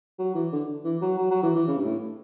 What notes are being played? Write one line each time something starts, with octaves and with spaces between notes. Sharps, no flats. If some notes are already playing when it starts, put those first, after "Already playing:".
F#3
E3
D3
E3
F#3
F#3
F#3
E3
E3
C#3
G2
A2